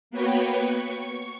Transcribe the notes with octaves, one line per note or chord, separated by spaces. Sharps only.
A#3 B3 F#4 B4 C#5 G5
C#6